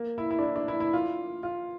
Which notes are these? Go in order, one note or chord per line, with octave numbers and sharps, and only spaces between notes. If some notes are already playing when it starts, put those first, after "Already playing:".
Already playing: A#3
E4
E4
D4
E4
D4
E4
E4
F4
F4